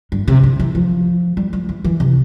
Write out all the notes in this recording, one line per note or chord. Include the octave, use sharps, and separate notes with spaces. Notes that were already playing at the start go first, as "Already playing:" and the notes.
G2
C3
D3
E3
F3
G3
F3
E3
E3
C3